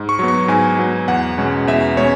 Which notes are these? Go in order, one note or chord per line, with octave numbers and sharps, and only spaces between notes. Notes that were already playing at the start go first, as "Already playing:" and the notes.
Already playing: G#2
C#6
F#3 B3
C#6
G#2 G#5
F#3 B3
E2 F#5
B2 G#3 C#4
E2 E5
B2 G#3 C#4 C#5